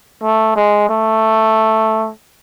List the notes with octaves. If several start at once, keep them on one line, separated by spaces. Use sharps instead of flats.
A3
G#3
A3